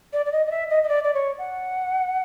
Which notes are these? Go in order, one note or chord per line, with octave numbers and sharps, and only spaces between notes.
D5
D5
D#5
D#5
E5
D#5
D#5
D5
D5
C#5
F#5